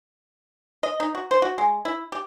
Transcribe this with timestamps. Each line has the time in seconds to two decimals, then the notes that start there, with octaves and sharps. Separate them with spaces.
0.83 D#5
1.00 D#4
1.15 F#4
1.31 C5
1.42 F#4
1.58 G#3
1.85 E4
2.12 G4